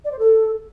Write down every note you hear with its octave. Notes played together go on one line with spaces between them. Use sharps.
D5
C5
A4